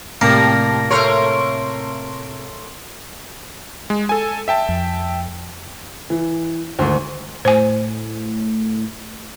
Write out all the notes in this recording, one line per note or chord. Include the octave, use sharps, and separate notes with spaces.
A2 C3 G3 A#3 A5 A#6
A3 A#4 C#5 C6
G#3
A4 G#5
E5 G5 A5
F2
E3
D2 G#2 D#3
A2 C5 G#5